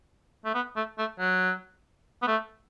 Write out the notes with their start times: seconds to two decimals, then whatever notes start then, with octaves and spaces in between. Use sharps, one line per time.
0.45 A3
0.54 B3
0.76 A3
0.98 A3
1.20 F#3
2.22 B3
2.27 A3